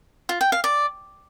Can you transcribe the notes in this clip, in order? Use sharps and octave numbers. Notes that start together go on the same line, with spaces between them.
F4
G5
F5
D5